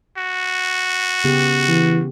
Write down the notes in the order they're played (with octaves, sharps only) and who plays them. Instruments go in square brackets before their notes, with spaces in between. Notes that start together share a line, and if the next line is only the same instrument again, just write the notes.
[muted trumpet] F#4
[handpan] C#3 B3 G4
[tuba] E3